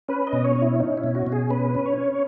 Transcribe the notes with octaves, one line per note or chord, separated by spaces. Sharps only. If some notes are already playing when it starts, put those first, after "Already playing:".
C#4 B4
D#5
B2
C#5
C#4
E4
C#4 D#4
E4
B2
F#4
B2
G#4
C#4 B4
C#4
C#5
C#4